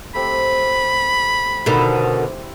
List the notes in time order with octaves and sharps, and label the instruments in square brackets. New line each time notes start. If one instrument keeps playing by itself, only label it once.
[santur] A3 C4 G4 [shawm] B5
[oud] B2 D3 D#3 [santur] E4 G4 C5